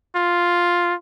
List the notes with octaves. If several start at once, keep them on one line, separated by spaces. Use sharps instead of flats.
F4